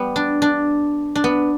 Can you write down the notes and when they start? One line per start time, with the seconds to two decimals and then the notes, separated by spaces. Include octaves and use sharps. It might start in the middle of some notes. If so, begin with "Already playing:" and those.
Already playing: G3 B3
0.16 D4
0.42 D4
1.15 D4
1.24 B3